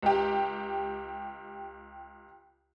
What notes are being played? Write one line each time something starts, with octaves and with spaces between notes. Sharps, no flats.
C#2 G4